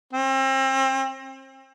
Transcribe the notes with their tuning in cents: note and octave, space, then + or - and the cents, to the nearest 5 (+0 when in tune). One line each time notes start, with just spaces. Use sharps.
C4 +35